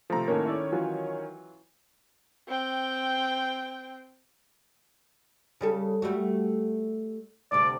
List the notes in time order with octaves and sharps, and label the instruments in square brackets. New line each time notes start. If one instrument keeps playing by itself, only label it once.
[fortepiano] C3 A3 [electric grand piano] F3 A#5
[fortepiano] A2 A#3 [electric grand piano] D#3 C#4 C#5
[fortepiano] E4 A4 D5
E3 F#3 F4
[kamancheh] C4 G5
[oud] C#3 G3 A4
G3 A3 F#4
[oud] D2 C3 [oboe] D5